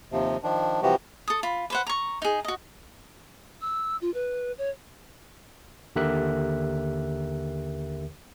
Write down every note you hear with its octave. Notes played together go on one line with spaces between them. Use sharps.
D#2 C3 F3
D#3 F3 D4
C3 E3 F3 G3 F#4 G4
A4 D#6
F4 B5
B4 C5 F#5
A#5 C#6
D#4 G#4
F#4 D#5
E6
F4
B4
C#5
D#2 D3 G4 A#4 E5 F#6